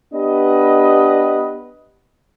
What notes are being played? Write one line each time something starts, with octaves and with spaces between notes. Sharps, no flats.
B3 D4 G4 B4 D#5